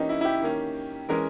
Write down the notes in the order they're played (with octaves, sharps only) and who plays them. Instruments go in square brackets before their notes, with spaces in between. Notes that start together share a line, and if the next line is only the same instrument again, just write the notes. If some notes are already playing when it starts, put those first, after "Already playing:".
Already playing: [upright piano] E3 A#3 C#4 D#4 G4
E4
E4
G4
D#3 A#3 C#4
E3 G#3 C#4 A#4